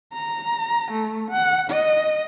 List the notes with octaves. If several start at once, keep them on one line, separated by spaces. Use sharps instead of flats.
A#5
A3
F#5
D#5